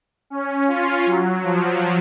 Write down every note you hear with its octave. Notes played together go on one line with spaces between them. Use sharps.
C#4
F4
F#3
F3